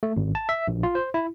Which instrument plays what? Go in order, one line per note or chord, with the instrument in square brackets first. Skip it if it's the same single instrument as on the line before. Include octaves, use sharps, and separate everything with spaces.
[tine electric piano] A3
G#1
A5
E5
A#1
F4
C5
E4